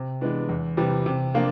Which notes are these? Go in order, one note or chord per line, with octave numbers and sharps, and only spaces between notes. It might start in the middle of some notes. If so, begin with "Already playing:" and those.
Already playing: C3
E3 G#3 B3 D4
E2
C3 E3 G3
C3
F3 A#3 D4 F4